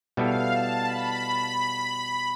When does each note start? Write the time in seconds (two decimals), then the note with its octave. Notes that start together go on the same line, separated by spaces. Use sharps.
0.17 B2 G3 B3 E4 A4 F5
0.50 A5
0.84 B5